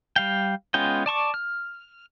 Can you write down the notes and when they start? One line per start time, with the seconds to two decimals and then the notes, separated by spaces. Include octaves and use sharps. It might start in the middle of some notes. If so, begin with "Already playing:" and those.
0.16 G3 F5 G5
0.74 G#3 B3 C#4 F4 G5
1.06 D5 A5 C#6 D6
1.34 F6